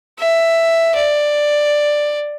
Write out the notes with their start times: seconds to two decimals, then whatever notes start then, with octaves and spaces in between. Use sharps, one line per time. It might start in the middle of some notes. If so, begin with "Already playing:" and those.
0.19 E5
0.96 D5